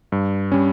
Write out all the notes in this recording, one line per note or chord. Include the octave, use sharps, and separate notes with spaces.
G2
G3 C#4